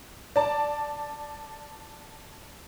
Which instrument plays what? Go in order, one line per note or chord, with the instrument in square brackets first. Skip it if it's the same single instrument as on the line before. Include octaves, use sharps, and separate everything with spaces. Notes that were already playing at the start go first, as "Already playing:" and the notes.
[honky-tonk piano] D5 A5